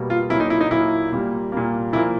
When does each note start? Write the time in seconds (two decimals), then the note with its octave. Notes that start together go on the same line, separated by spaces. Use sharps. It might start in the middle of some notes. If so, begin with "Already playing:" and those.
Already playing: B2 G3 A#3
0.10 F4
0.30 A#2 F#3 A#3 E4
0.40 D#4
0.50 E4
0.61 D#4
0.71 A#2 F#3 A#3 E4
1.12 A#2 G3 A#3
1.52 A#2 G3 A#3
1.93 A#2 F3 A#3 E4